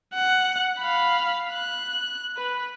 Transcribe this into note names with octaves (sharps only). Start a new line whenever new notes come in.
F#5
F5 B5
F#6
B4